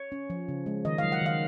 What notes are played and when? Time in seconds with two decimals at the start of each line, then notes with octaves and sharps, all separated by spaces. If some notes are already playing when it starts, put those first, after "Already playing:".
Already playing: C#5
0.12 C#4
0.30 F3
0.48 C#3
0.66 G#3
0.85 D#3 D#5
0.98 F5
1.03 F#3
1.12 F#5
1.21 D#3 F5